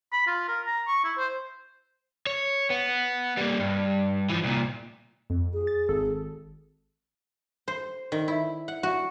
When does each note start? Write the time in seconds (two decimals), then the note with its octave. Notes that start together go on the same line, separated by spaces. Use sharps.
0.13 B5
0.27 F4
0.48 A#4
0.66 A#5
0.88 C#6
1.04 E4
1.17 C5
2.27 C#5
2.70 B3
3.37 G3 A#3
3.60 G2
4.29 E3 F3
4.43 C2 A#2
5.30 F2
5.53 G#4
5.67 A6
5.89 G#1 A4
7.68 C5
8.12 D#3
8.28 E4
8.68 F#5
8.83 F#4